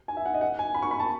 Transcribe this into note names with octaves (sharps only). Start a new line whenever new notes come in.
G#5
E5
F#5
D#5
F#5
G#5
B5
C#6
B5
A5